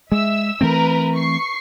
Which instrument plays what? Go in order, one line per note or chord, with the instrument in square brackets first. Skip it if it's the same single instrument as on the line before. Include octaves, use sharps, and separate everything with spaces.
[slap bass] G#3 [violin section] E5 E6
[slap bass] E3 A3 C4 [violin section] A#4 B4 A#5
[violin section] C#6 C7